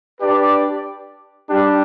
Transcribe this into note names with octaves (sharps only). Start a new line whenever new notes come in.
D4 G4 B4 D5
G3 D4 G4